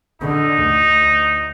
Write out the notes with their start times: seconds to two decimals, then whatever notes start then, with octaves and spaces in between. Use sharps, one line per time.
0.21 D3 D#4
0.63 D2